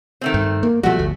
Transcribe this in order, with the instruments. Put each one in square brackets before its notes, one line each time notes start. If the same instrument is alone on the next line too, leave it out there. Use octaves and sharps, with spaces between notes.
[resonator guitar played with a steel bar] D#3 A3 C4
[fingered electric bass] G2
A#3
[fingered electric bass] B2 F3 G3 [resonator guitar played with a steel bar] A3 F#4
[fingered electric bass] G1 D2